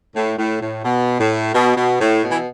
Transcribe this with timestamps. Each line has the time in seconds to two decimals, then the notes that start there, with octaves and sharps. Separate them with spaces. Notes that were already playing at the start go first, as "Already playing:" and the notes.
0.16 A2
0.38 A2
0.62 A2
0.85 B2
1.20 A2
1.54 B2
1.77 B2
2.01 A2
2.23 B2
2.31 E3